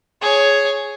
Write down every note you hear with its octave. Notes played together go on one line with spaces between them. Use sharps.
G#4 C#5